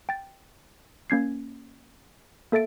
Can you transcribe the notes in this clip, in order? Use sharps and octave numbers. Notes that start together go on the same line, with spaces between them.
G5 A6
A#3 C#4 G#6 C7
A#3 A4 E5 A6 D7